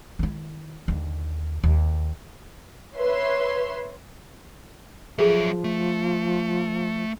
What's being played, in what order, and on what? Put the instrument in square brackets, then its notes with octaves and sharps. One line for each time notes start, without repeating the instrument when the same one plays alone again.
[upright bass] D#3 E4
D#2 D3
D#2
[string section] B4 C#5 E5 C6
[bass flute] F3 [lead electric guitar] F#3 E5 [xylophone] G#4 A4
[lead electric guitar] A3